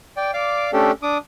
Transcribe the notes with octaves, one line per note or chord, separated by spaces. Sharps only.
D5 G5
D5 F5 D6
A3 C#4 D4 G4 A4
D4 D6 D#6